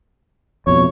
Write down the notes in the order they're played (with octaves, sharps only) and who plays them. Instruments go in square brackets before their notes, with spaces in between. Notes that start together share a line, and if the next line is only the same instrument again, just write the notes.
[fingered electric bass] F2 B2 [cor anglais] C#5